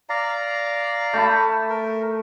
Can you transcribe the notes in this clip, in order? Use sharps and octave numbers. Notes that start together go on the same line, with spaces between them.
D5 F5 A#5
A3 A5 B5
A#4